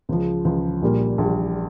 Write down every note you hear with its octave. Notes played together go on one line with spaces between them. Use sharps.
C#2 C#3 F3
C#2 C#3 F3
A#1 A#2 G3 A#3
A#1 A#2 G3 A#3